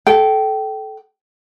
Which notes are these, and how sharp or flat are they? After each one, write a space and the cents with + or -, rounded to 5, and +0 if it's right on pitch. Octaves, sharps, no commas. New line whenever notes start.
A4 -20 G5 -20